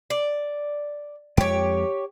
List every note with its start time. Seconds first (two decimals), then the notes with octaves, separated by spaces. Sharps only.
0.10 D5
1.37 F2 G#3 G4 C#5